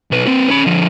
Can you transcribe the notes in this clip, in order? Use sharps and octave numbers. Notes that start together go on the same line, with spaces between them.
B1 B4
C4 B4
C#4 B5
D3 F3